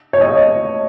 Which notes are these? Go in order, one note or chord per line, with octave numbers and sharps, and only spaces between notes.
C#5
D#5